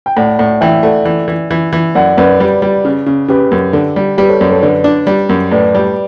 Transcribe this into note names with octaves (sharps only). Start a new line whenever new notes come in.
G5
A2 D5 F#5
A2 D5 F#5
E3 E5 G5
A3 D5 F#5
E3
E3
E3
E3
F#2 D5 F#5
F#2 B4 D5
G3
G3
C#3
C#3
C#3 G4 B4
F#2
D3
G3
G3 G4 B4
A4 C#5
F#2 B4 D5
A4 C#5
D3 B4 D5
D4
G3
F#2
A2 B4 D5
G3